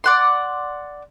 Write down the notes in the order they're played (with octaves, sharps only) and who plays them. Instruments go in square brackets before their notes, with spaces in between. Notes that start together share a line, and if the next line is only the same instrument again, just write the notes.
[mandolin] D5 F#5 C6